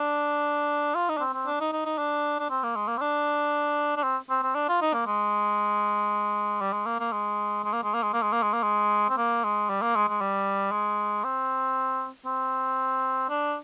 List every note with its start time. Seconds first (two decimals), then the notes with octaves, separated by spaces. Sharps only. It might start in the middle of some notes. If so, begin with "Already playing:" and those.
Already playing: D4
0.95 F4
1.09 D#4
1.17 D4
1.20 C4
1.34 C4
1.46 D4
1.60 D#4
1.72 D#4
1.85 D#4
1.98 D4
2.39 D4
2.50 C4
2.63 A#3
2.76 G#3
2.87 A#3
2.97 C4
3.01 D4
3.96 D4
4.03 C4
4.30 C4
4.43 C4
4.55 D4
4.69 F4
4.81 D#4
4.94 A#3
5.06 G#3
6.61 G3
6.73 G#3
6.86 A#3
7.00 A#3
7.12 G#3
7.64 G#3
7.73 A#3
7.83 G#3
7.94 A#3
8.03 G#3
8.13 A#3
8.22 G#3
8.32 A#3
8.43 G#3
8.53 A#3
8.63 G#3
9.09 C4
9.17 A#3
9.44 G#3
9.70 G3
9.82 A#3
9.95 G#3
10.08 G#3
10.21 G3
10.72 G#3
11.24 C4
12.26 C4
13.29 D4